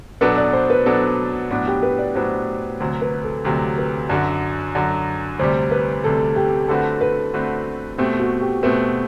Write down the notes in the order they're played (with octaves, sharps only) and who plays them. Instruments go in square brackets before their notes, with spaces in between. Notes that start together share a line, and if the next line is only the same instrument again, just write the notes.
[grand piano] B2 F#3 B3 D4 A4 [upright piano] B4
[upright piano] D5
C5
B4
[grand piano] B2 F#3 B3 D4 A4
A2 F#3 B3 D4
[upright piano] G4
B4
D5
[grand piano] A2 F#3 B3 D4 [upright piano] C5
[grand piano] D2 C3 F#3 [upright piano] C5
[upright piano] B4
A4
[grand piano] D2 C3 F#3 [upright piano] G4
[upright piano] B4
[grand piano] F#2 D3 F#3
F#2 D3 F#3
[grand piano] D2 C3 G3 [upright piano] C5
[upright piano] B4
[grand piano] D2 C3 G3 [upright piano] A4
[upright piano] G4
[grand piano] D3 A3 C4 F#4 B4 [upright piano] A4
[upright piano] B4
[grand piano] D3 A3 C4 F#4 B4
[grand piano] B2 A3 C4 [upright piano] G4
[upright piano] F#4
G4
[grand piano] B2 A3 C4 [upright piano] B4